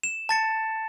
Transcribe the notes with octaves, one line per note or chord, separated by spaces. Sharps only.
E7
A5 A6 C#7